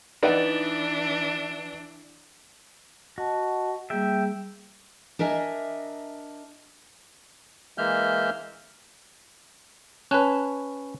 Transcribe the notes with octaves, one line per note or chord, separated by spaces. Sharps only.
E3 D4 D#4 B4 D5 E5 F#5
F#4 D#5 F#5 A5
G3 A#3 G#4 E5 G5
D4 A#4 D#5 E5 G#5
E3 G#3 A#3 E5 F6 G6
C#4 B4 C#5 A5 F#6